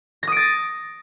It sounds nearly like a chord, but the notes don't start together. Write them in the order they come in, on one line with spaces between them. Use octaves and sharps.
A#6 D#6 D7 A6